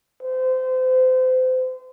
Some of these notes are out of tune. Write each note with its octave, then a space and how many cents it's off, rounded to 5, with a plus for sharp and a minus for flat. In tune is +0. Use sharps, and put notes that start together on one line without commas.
C5 -30